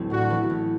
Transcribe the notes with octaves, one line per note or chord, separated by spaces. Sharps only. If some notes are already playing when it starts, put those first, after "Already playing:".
Already playing: A1 D2 F#3 C4
A2 D4 F#4
E3 B3
A1